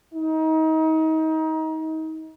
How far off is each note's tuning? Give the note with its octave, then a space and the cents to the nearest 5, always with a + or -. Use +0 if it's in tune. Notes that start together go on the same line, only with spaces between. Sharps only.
D#4 +30